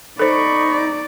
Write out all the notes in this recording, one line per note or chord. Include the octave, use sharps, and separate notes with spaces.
D#4 A4 C5 D5 B5 C#6
D5